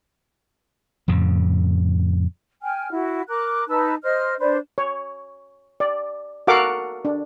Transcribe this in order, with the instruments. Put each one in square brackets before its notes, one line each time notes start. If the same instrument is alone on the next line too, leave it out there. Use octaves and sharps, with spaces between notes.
[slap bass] F2 A2 C#3
[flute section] G5 G#5 F6
E4 F#4
A#4 D6 F#6
D#4 B4 A5 E6
C5 D#5 F6
D4 B4 C5 D5
[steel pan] C#5
D5
F#4 A4 A#4 F5 F#5 D6
D4